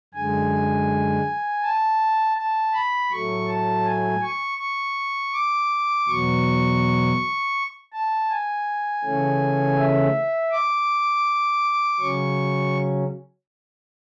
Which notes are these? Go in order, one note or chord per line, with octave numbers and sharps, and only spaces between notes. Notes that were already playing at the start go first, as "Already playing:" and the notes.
F#2 D3 G#3 G#5
A5
A5
B5
A2 F#3 A3 C#6
A5
G#5
C#6
C#6
D6
E2 B2 F#3 C#6
A5
G#5
C#3 E3 A3 C#4
E5
D6
C#3 F#3 C#4 C#6